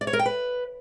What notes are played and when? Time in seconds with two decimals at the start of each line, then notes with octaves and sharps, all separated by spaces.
0.01 D5
0.07 C#5
0.13 A#4
0.19 G5
0.26 B4